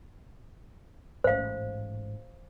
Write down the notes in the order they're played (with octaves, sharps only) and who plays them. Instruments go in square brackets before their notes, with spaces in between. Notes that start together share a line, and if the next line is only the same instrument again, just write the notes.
[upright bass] A1 G#2 [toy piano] C5 F5